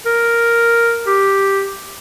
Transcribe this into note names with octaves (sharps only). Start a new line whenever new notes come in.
A#4
G4